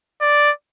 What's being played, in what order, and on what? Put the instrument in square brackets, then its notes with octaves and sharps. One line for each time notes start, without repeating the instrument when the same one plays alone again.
[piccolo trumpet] D5